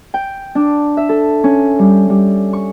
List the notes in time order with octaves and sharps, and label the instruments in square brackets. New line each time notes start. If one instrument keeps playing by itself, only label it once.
[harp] G5
D4
E5
A4
C#4
G3
G3
C#6